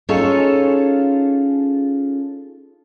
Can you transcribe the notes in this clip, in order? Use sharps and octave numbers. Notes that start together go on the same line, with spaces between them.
C#4 D#4 F4 G#4 A4 C#5